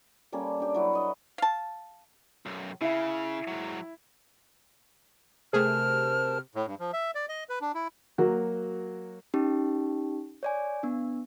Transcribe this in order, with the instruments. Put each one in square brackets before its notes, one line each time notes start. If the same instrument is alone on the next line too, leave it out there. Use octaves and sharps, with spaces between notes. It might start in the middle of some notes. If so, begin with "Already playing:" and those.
[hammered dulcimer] G3 A#3 C#4 A4
D4 G4
F#3 E4 B4
B4 D#5
[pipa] F5 A5
[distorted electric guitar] B1 F#2
[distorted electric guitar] C#3 [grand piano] E4 E5
[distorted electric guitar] G#2 F#3
[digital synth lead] C3 [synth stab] A3 G#4 [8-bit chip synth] A#4 C5 A5 [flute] F6
[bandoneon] A2
G2
F3
E5
D5
D#5
B4
D4
E4
[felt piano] F#3 A#3 F#4
[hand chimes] C#4 D#4 G4
C#5 D5 G#5
B3 D4